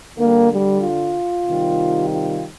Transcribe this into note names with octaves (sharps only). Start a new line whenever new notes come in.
D3 G3 A#3
G3
F4
C3 D#3 G3
F4